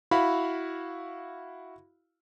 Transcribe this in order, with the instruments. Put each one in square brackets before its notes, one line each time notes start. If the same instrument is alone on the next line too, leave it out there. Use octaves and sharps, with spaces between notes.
[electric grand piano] E4 F#4 F5 B5